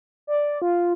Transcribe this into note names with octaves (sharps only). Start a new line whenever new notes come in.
D5
F4